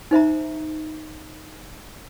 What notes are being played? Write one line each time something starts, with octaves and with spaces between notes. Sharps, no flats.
D#4 C5 E5 A#5